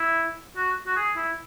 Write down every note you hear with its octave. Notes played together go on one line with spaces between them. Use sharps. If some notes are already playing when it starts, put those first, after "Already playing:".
Already playing: E4
F#4
F#4
G#4
E4